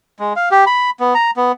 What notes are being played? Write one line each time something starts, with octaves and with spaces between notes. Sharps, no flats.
G#3
F5
G4
B5
B3
A#5
B3